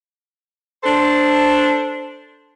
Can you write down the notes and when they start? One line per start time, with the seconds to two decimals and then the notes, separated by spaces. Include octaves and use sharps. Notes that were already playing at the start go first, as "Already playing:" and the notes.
0.83 D4 A4 C5